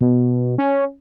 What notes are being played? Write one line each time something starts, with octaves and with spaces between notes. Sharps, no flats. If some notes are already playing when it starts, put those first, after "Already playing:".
B2
C#4